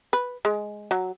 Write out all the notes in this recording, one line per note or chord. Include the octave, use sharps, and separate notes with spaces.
B4
G#3
F#3